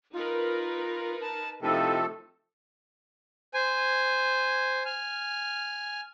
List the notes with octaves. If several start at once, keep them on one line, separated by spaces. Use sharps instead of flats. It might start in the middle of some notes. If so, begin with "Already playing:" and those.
D#4 F4 A#4 B4
A5
C3 F3 A3 D#4 E4 A4
C5 G#5
G#5 F6